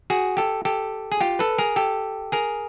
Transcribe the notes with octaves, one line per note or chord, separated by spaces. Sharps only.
F#4 G#4
G4 A4
G4 A4
G#4
F4 G4
A4 B4
G#4 A#4
G4 A4
G#4 A#4